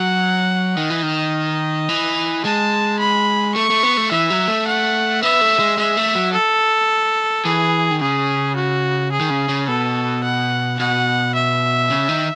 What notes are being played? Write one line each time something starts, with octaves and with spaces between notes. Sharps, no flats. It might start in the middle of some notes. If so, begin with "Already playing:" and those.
Already playing: F#3 F#5
D#3 D#5
E3
D#3
E3
G#3 A5
B5
A3 C#6
A3
B3
A3
E3 E5
F#3
A3
F#5
B3 E5
A3
G#3
G#3 E5
A3
F#3
A4
E3 G#4
D#3
C#3 G#4
F#4
G#4
D#3
C#3
C#3
B2 A4
F#5
B2 F#5
E5
C#3
D#3